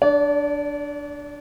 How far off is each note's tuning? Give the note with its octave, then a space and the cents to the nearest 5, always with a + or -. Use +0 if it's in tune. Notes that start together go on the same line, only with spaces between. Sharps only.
D4 +0 D5 -40